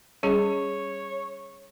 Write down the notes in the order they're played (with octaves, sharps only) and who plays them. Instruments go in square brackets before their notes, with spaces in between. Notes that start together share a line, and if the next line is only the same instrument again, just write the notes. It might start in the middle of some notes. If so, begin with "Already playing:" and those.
[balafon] G3 C#4 G#4 [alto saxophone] C#5